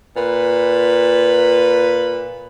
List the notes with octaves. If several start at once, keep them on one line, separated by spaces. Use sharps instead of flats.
A#2 B4